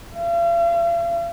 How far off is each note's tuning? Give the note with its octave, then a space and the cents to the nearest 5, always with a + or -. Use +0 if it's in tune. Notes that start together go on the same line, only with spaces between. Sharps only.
F5 -45